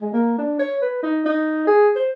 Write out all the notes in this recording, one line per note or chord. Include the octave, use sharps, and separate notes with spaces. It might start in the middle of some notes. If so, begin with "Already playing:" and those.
G#3
A#3
D4
C#5
B4
D#4
D#4
G#4
C5